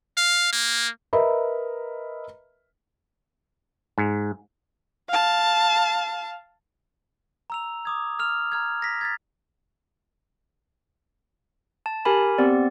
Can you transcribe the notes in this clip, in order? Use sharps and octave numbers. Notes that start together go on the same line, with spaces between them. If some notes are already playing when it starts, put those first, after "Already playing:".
F5
A#3
A#4 B4 D#5 E5 A#5 B5
G#2
F5 A5
A#5 E6 F7
D6 D#6 G#6
E6 F6 F7
A#5 F6 G#6
A#6 B6
G#6 A6 B6
A5
G4 A#4 G#5 B5
B3 C4 G4 D5